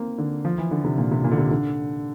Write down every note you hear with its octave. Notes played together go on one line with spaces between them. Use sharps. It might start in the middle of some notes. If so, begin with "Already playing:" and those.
Already playing: A#3 C4
D3
F3
E3
D3
C3
A#2
C3
A#2
D3
C3
D3